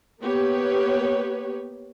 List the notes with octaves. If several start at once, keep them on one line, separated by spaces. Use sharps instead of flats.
A#3 B3 G4 B4 C#5